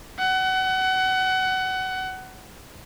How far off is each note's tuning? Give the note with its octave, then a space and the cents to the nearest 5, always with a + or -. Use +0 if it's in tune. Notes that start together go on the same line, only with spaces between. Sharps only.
F#5 +25